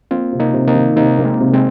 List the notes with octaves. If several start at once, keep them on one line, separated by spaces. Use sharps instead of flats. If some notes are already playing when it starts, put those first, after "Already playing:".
A#3 C4 F4
C3
A#3 D#4
C3
A#3 D#4
D#3
C3 A#3 D#4
A#3
G#3 C4
C3
G#3 C4